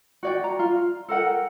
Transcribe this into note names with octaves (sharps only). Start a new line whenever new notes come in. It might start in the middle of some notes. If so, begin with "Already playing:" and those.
F#4 D5 G5
A#5
F4
A4 A#4 F#5 G5